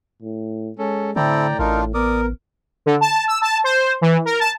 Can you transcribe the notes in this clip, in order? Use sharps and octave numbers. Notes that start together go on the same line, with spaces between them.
A2
G#3 C#4 A4
A2 D3 C4 E4 A4 D5 G5 A#5
A1 D4 D#4 F4 A#4
B3 A#4 D5 D6 D#6
D3
A5
E6
A5
C5
E3
A#4
A5